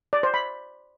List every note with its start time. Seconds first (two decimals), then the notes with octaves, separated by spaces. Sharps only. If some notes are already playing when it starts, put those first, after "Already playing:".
0.13 D5
0.23 C5
0.34 B5